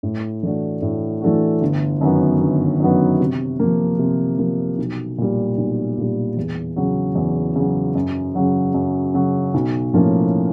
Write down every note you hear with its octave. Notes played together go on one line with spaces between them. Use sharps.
A2
E3 A3 D4 F#4
A2
E3 A3 D4 F#4
G1
F#2 D#3 F#3 B3
G1
F#2 D#3 F#3 B3
C3
F3 A#3
C3
F3 A#3
B1
A#2 G3
B1
A#2 G3
E2
C#3 F#3
E2
C#3 F#3
F#2
C#3 F#3
F#2
C#3 F#3
B1
A2 F3 A#3 C#4